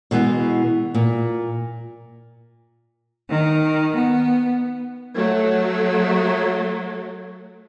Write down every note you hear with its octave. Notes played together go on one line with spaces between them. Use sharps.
B2 E3 G#3 B3
A#2
D#3
B3
F#3 A3